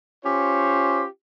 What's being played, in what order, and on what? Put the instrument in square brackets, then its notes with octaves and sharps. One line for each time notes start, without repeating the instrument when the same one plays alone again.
[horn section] C#4 F4 G4 C5 C#5